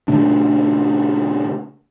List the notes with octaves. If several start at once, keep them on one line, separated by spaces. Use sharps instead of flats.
A#2 C#3 A3 D4